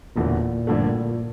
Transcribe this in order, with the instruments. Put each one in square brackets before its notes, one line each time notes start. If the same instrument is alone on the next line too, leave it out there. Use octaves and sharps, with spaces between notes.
[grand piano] E1 E2 D3 A3 [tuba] A#2
[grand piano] A1 G2 D3 F3 A3